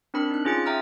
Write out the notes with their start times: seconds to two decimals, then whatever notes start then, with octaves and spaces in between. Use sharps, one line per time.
0.14 C4 D4 A#4 B5 C#7
0.30 D#4 F#6
0.45 C#4 F4 G#4 A6 C#7
0.66 E5 G5 A#5 D#6 F6